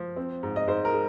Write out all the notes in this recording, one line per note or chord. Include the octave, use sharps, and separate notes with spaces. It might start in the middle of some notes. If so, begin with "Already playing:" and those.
Already playing: F3
C4
G#2
D#5
G#2 C5
A#4
G#3